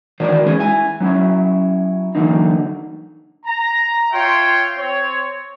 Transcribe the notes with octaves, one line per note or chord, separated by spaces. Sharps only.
D#3 E3 F#4 A#4 C5 D5
E3 G#3 C#4 G#4
E4 G#5
F#3 C#4 E4
D3 E3 F#3 A#3 C4 D#4
A#5
F4 C#5 E5 G5 C6
C4 C#5